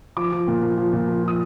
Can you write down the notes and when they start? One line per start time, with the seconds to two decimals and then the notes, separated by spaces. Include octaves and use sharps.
0.17 F3 D6
0.32 F3
0.48 A#2
0.62 F3
0.78 F3
0.93 A#2
1.08 F3
1.23 F3 D#6